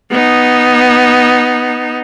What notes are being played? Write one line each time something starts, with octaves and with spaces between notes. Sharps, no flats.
B3 D#4